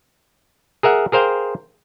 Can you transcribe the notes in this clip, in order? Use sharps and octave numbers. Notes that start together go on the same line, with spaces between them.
G#4 A#4 E5 F#5
G#4 A#4 C5 F5 G5